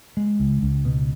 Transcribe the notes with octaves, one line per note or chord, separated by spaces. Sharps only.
G#3
C#2
C#2
B2